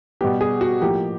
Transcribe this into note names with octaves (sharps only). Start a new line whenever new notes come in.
B2 G3 B3 G4
G#4
F#4
A2 F3 A#3 G4